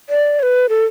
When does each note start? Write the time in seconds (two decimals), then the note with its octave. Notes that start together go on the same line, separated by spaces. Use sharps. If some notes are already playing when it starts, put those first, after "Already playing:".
0.09 D5
0.40 C#5
0.43 B4
0.69 A4